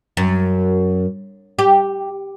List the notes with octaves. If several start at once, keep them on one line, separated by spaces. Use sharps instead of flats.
F#2
G4